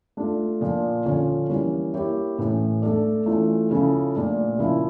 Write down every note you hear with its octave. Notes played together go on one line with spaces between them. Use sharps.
A3 D4 F4
A#2 F3 A#3
D3 F3 C#4 F4 C#5
E3 G3 A#3 C#4
A#3 E4 G4 C#5
A2 E3 A3 C#4
A3 D4 A4 D5
E3 A3 C#4 F4
C#3 F3 C#4 E4 A4
A#2 A3 D4 A4
C#3 F3 A#3 E4